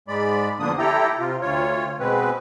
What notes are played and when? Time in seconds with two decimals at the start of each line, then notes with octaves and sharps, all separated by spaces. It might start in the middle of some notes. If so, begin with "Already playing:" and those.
0.08 G#2 G#3 D5 B5
0.60 E2 D3 F3 A#3 D4 D#6
0.78 E4 G4 A4 G5 A#5
1.18 C3 F4
1.42 D2 F4 C#5
2.00 B2 G#3 C4 B4